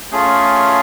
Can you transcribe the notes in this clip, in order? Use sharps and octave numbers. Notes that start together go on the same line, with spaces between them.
A3 C#4 F4 G#4